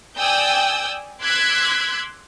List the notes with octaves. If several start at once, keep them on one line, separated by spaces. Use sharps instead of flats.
D5 G5 G#5 D#6 E6 G6
C6 D6 E6 F#6 G#6 B6